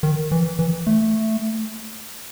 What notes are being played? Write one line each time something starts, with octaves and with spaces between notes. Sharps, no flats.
D#3
E3
E3
A3